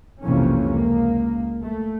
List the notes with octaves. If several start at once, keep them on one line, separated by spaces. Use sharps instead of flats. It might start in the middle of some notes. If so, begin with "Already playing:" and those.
B1 F2 C3 E3 A#3 C#4
C#2 A#3
A3